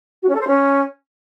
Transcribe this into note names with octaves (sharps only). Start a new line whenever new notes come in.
F#4
C#4
A4
C5
C#4